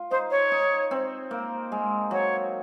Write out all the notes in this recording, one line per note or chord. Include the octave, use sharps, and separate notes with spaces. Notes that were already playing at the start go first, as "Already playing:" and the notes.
Already playing: F4
D#4 C5
C#5
D#4
C4
A#3
G#3
F#3 C#5